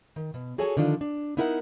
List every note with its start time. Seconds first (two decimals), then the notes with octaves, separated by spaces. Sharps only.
0.16 D#3
0.34 B2
0.58 F#4 G#4 A4 C#5 G#5
0.77 D3 D#3 F3 D4
1.01 D4
1.37 B3 D#4 E4 A#4 D#5 F#5